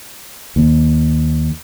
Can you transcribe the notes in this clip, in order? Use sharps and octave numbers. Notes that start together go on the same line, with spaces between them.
D#2